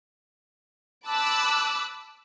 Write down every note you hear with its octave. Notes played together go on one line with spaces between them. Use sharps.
A5 B5 D6 E6 F#6